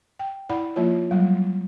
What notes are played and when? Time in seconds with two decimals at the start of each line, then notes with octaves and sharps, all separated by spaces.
0.19 G5
0.50 E4 D5 F#5 B5
0.76 F3 A#3 F4 C#5
1.11 F#3 G3